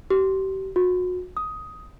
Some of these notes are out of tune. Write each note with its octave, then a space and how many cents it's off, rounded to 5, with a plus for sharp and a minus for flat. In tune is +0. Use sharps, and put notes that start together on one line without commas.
G4 -35
F#4 -30
D#6 +10